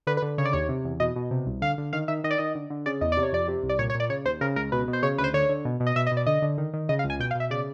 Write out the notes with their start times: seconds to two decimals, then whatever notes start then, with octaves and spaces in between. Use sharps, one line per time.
0.07 D3 B4
0.17 B4
0.22 D3
0.38 C#3 C#5
0.45 D5
0.53 D#2 C#5
0.69 C3
0.84 E2
1.00 B2 D#5
1.16 B2
1.31 C3
1.46 C2
1.62 D3 F5
1.78 D3
1.93 D#3 F5
2.08 D#3 E5
2.24 D#3 D#5
2.31 D5
2.38 D#3 D#5
2.55 D3
2.70 D3
2.86 C#3 D5
3.01 E2 D#5
3.12 D5
3.17 C3
3.23 C#5
3.32 F2 D5
3.48 C3
3.63 C2
3.69 D5
3.79 A#2 C#5
3.90 C#5
3.95 A#2
4.00 D5
4.10 C#3 C#5
4.25 D#2 C5
4.41 C#3 A#4
4.56 C#2 A#4
4.72 B2 B4
4.88 B2
4.93 C5
5.03 C#3 C#5
5.18 D2 B4
5.24 C5
5.34 D3 C#5
5.49 D3
5.65 B2
5.80 B2
5.87 D#5
5.96 B2 E5
6.07 D#5
6.12 B2
6.17 D5
6.27 D3 D#5
6.42 D3
6.58 D#3
6.74 D#3
6.89 C#3 D#5
6.99 F5
7.04 C#2
7.10 G#5
7.20 B2 G5
7.31 F5
7.35 B2 E5
7.51 C#3 D5